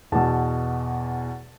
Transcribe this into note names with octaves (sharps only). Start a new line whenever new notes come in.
E2 B2 A5